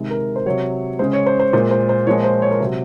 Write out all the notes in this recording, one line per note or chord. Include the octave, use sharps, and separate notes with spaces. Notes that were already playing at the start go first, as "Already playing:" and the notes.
Already playing: C3 D#3 G#3
A#4
C5
C3 F#3 C#5
C#3 G#3 C5
C#5
C5
C5
A#2 G#3 C5
C5
C5
A#2 F3 G#3 C#5
C5
C#5
A#4
C3 F#3 C5